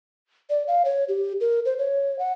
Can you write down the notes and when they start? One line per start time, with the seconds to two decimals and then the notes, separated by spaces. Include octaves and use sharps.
0.50 D5
0.68 F5
0.85 C#5
1.08 G4
1.41 A#4
1.65 C5
1.78 C#5
2.19 F#5